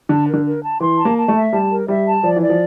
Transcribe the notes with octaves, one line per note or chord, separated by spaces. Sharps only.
D3 A5
A#4
D3
A#4
A5
E3 C6
A5
A#3
A5
A3
E5
G3 A5
A#4
G3 E5
A5
F3 D5
E3
D5
F3